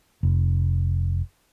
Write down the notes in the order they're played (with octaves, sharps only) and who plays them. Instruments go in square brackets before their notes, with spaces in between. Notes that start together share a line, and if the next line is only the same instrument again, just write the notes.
[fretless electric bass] F1